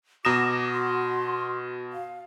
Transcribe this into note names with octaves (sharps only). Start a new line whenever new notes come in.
B2 F#4 A#5 D6 D#6 A#6 E7
C6
F5